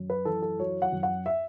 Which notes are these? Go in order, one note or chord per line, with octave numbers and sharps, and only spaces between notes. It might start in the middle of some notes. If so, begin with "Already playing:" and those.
Already playing: F#2
B4
E3 A4
A4
F#3 C#5
F#5
F#2
F#5
E5